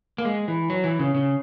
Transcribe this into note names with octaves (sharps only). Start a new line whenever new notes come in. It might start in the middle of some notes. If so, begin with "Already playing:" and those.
A#3
G#3
E3
F#3
E3
C#3
C#3